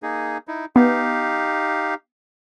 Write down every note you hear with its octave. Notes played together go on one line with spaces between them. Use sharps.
A#3 D#4 G#4
D#4 E4
B3 D#4 G4 F5